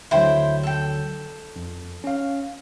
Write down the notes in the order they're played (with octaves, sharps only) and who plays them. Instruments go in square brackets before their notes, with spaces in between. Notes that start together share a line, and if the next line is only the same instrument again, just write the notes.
[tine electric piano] D2 D3 F#3 [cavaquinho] E4 C5 G5
[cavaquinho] A4 G5
[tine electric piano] F2
C#4 F5